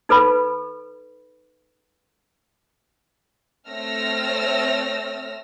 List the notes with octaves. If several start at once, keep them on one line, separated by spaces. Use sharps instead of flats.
D#4 A4 B4 B5
A3 C4 C#5 E6 F6 A#6